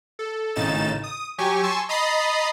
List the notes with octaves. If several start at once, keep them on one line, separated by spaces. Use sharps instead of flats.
A4
G#1 A2 C#3 D#4 A6 E7
D#6
F#3 G4 G#5 C#6
G#5 A5 C6 C#6 E6
D#5 A#5 B5 D#6 A6 C7